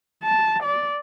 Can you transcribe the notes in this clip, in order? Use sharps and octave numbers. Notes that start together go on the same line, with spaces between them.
A5
D5